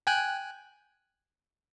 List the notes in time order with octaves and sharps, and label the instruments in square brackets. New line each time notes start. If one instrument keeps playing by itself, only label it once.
[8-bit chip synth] G5 G#5 F#6